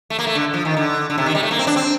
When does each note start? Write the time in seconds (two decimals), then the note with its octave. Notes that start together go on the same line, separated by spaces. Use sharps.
0.10 A3
0.19 A#3
0.27 A3
0.35 D3
0.54 F3
0.65 D#3
0.77 D3
1.10 D3
1.18 C3
1.26 D#3
1.35 G3
1.43 A3
1.51 A#3
1.59 C4
1.67 D4
1.76 C4